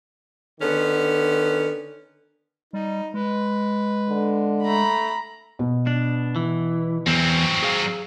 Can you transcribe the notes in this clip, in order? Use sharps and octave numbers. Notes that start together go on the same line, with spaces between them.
D3 D#3 B3 C#4
G3 D#4
G#3 B4
D3
A3 A#5 B5
B2
D4
E3
E2 F#3 C4
G#4 F5